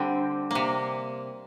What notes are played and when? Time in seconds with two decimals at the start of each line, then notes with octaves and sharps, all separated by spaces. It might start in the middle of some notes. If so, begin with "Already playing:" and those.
Already playing: D3 G3 C4
0.51 C3 A#3